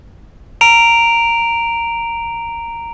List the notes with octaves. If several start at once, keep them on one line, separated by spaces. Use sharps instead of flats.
A#5 D7 F7